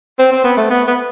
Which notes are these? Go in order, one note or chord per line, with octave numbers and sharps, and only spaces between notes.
C4
C4
B3
A3
B3
B3